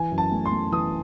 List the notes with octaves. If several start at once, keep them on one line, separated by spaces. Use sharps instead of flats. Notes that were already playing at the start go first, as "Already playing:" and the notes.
Already playing: E3 G#5
F#2
A5
A3
C6
A3
E3 D#6